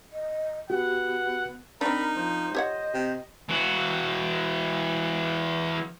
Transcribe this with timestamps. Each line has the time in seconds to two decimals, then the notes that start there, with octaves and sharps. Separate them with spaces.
0.12 D#5
0.70 B3 F#4 G4 F#5
1.81 C4 D4 D#4 A#4 B5
2.16 F3 C5
2.55 G4 C#5 D#5 F#5
2.93 C3
3.49 E3 F#4